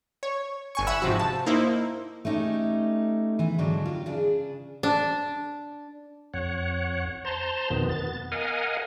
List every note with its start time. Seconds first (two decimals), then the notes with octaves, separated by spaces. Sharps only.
0.23 C#5
0.75 G1 G#5 C#6
0.87 E5 F#5 B5 E6
1.02 G#2 C3 F3 F#4
1.19 A5
1.46 A#3 D#4 E4 C5
2.25 A3 C#4 D#4 G4
3.39 E3 B3
3.58 G#2 D3 F#3 D4 D#4
3.86 F4 G4
4.06 C#3 D4 G#4
4.83 D4
6.34 F2 C#5 F#5
7.25 C5 A5 A#5 C6
7.70 F2 B2 D#3 B3
7.89 B3 A6
8.32 A#4 D#5 F5 F#5 G#5